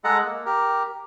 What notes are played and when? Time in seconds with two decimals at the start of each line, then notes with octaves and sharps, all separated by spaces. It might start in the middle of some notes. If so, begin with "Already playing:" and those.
0.04 G#3 A4 D#5 F#5 A#5
0.24 A#3
0.46 G4 A#4